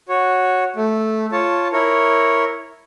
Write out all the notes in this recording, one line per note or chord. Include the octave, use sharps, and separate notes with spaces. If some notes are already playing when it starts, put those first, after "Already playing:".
F#4 C#5
A3
F4 C#5 A5
E4 A#4 C#5